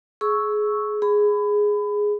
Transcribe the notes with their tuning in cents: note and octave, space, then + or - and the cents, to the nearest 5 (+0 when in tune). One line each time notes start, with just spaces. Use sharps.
G#4 +20 C#6 +0 E6 -5
G#4 +0 B5 +25